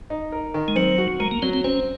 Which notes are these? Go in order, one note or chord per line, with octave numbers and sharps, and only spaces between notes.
D#4
A#4
D#3
G#3
F#3 C4
F#4
G#3 A#4
A#3
F#3 C4
C4
C4 C#4